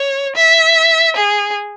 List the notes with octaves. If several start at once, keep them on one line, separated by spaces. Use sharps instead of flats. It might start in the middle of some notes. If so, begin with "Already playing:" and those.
Already playing: C#5
E5
G#4